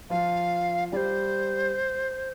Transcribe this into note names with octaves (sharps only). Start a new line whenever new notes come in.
F3 F4 F5
G3 G4 C5 D5